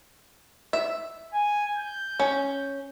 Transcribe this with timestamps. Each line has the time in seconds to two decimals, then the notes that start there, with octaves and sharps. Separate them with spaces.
0.73 E5
1.33 G#5
1.77 G6
2.20 C#4